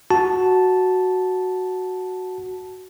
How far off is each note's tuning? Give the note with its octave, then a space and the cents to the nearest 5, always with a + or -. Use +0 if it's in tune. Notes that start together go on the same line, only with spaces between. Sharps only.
F#4 +0 A5 -5